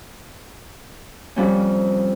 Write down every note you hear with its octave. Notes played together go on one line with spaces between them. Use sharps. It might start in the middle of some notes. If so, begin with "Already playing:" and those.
F2 G3 C#4